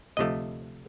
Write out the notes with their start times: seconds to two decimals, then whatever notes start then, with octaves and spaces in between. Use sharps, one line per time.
0.17 D2 C3 F3 A3 D#5